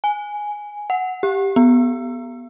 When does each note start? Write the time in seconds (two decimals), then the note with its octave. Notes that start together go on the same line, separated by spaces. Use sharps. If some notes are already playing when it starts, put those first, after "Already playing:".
0.04 G#5
0.90 F#5
1.23 G4
1.56 B3